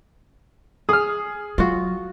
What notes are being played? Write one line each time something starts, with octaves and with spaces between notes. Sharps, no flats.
G#4 D#6 F6
F#3 F4 F#4